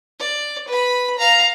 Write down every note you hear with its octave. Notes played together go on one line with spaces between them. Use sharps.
D5
B4 B5
F5 A#5